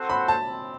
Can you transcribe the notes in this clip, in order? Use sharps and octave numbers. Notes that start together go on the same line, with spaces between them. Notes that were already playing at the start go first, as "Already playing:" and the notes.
Already playing: C4 F#4 A4 C5 F#5
B5
A5
C4